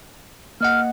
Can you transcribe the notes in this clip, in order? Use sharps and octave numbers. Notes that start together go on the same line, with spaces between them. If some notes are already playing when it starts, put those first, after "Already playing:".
A#3 D#5 F#5 F6